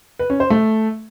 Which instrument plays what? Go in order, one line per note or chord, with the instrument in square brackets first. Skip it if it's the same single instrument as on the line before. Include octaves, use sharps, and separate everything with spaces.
[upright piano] B4
C#4
C5
A3